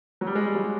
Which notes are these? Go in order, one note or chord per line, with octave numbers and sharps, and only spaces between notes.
F#3
G3
G#3
G3
F#3
G3